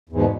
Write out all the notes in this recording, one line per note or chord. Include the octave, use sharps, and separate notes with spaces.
E2 G#2 B2